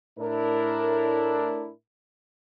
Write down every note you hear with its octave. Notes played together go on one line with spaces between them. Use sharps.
A2 D4 E4 A#4